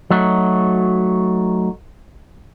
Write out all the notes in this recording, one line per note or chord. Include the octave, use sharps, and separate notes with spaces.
F#3 A3 D#4 F#4